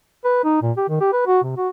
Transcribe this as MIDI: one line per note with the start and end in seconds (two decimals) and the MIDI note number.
0.25 0.43 71
0.44 0.61 63
0.62 0.71 46
0.77 0.86 67
0.89 1.01 51
1.01 1.12 67
1.13 1.25 71
1.27 1.41 66
1.43 1.55 48
1.57 1.69 66